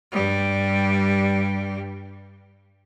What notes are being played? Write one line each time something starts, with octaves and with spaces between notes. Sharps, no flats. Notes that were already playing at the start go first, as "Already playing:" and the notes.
G2 G3